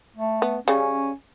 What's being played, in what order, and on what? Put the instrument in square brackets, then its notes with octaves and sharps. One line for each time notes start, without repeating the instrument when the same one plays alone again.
[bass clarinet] A3
[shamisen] B3
[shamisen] C#3 G3 [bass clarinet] C#4